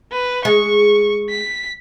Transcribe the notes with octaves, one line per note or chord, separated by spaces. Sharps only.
B4
G#3 C#6
B6